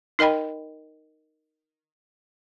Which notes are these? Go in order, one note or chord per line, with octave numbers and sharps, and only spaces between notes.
D#4 A#4 D#5 G5 B5